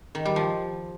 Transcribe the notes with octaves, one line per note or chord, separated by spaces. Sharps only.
D#3
G3
F3